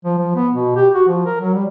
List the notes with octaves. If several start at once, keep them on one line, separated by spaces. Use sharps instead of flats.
F3
F3
B3
B2
G4
F#4
F3
A#4
F#3
G3